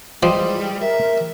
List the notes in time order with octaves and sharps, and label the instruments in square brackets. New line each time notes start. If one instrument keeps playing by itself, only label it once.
[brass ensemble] E3 G#3 [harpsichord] F3 [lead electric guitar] G3 [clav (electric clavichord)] G4 C5 D#5
[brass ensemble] A#4 [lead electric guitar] E5